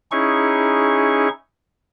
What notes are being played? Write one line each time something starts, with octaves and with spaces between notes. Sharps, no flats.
C#4 D#4 E4 G#4 C#6